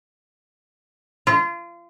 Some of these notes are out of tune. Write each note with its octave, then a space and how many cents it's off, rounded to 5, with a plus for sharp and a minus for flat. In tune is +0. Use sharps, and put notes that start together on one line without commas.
F4 -30